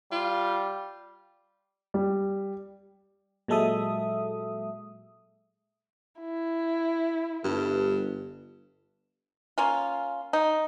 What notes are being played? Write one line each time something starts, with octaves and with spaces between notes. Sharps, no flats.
G3 F4
G3
A#2 F#3 G#3 A4 E5 D#6
E4
G1 G2
A#3 C#4 F4
D#4